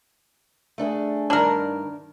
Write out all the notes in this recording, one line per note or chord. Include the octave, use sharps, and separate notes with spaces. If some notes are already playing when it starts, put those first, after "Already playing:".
A3 D4 G#4
G2 D#3 D4 A#4